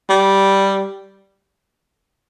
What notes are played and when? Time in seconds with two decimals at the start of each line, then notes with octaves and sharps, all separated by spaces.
0.10 G3